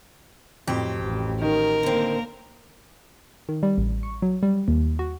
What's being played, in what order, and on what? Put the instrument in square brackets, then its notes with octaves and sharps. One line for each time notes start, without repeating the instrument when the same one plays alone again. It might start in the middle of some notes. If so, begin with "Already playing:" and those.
[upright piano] F2 [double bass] A2 [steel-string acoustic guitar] F#3 C4 G4
[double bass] A1
[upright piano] D#3 [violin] A#4
[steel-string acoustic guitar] D3 C4 [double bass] A#3
[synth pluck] D#3
G3
A1
C#6
F#3
G3
D#2
F#4